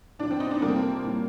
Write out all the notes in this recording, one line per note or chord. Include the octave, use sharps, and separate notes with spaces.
A2 F3 D4
C4
D#4
C4
D4
F2 C3 G3 A#3
C4
A#3
A2 G3